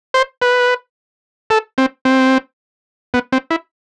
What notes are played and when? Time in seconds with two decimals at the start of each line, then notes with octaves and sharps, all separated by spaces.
0.14 C5
0.42 B4
1.50 A4
1.78 C4
2.05 C4
3.14 B3
3.32 C4
3.51 E4